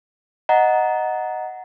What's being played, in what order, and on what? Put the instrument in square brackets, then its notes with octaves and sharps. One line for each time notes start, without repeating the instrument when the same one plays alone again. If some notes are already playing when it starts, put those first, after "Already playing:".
[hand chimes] D#5 F#5 A#5